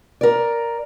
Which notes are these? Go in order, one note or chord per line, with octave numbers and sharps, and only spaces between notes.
A#4 D5